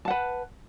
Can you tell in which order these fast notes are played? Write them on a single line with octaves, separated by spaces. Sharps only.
A5 F#5 B4